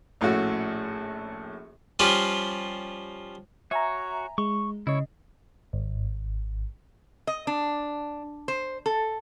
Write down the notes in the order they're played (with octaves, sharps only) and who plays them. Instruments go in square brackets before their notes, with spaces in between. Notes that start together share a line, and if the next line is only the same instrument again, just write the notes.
[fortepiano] A#1 A2 A3 C#4 F#4
[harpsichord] F3 G3 C#4 F4
[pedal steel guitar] F#4 C#5 [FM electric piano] E5 G#5 A#5
[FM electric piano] G#3 [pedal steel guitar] C#6
[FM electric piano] C#3 D#5 [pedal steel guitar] E4 C#5
[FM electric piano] G#1
[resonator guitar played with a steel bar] D#5
D4
C5
A4